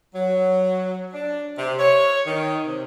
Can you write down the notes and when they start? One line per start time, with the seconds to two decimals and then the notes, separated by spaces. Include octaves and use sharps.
0.14 F#3
1.13 D4
1.58 C3
1.79 C#5
2.27 D#3
2.66 C3